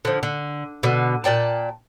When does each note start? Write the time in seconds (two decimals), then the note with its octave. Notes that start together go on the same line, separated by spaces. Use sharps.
0.05 D3 F3
0.23 D3
0.83 B2 D3
1.24 A#2 D5 G5 A5